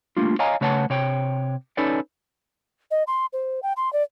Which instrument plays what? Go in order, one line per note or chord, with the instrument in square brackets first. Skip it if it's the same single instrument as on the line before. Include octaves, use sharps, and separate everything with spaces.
[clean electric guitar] G3 A3 A#3 D4 F4
C#5 D#5 F5 G#5 A#5
C#3 A3 B4 C#5 F#5 A5
C3 C#5 G5
C#4 D#4 A4 B4 C#5 D5
[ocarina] D#5
C6
C5
G5
C6
D5